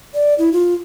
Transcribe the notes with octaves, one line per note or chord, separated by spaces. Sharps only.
D5
E4
F4